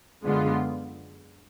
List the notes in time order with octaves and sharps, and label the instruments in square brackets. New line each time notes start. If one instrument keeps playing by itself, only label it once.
[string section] F#2 D3 G#3 B3 F4